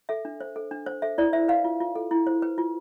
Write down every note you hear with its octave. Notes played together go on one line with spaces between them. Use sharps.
A4 E5
D4
C5
A4
D4
C5
A4 E5
E4 D5
C5 E5
B4 F5
F4
F4
A4
E4
C5
B4
F4